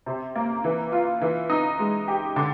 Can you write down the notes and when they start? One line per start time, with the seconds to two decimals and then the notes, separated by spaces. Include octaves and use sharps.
0.06 C3
0.35 A#3
0.64 E3
0.92 F4
1.21 E3
1.50 D#4
1.79 G#3
2.08 G4
2.36 D3